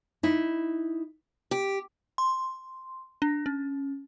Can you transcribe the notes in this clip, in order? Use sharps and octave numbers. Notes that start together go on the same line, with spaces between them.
D#4 E4
G4
C6
D4
C#4